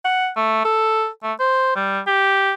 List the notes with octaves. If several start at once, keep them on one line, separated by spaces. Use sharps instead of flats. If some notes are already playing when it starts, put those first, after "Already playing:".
F#5
A3
A4
A3
C5
G3
G4